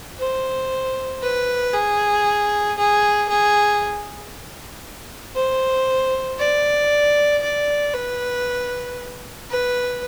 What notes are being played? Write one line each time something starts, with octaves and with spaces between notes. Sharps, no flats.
C5
B4
G#4
G#4
G#4
C5
D5
D5
B4
B4